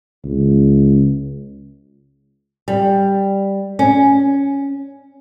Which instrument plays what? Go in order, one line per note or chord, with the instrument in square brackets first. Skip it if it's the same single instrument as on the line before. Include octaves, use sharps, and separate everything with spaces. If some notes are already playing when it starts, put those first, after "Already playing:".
[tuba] C#2
[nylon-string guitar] G3
C#4